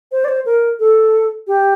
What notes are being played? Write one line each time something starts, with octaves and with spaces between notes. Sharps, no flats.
C5
D5
C5
A#4
A4
G4